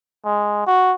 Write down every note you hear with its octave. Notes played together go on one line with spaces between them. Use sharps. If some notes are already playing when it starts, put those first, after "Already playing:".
G#3
F#4